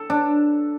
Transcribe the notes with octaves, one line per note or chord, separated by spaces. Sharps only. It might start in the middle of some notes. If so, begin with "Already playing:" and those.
Already playing: A4
D4